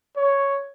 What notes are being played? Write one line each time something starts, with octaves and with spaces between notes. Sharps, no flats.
C#5